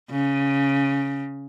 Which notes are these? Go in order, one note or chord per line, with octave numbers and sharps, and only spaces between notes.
C#3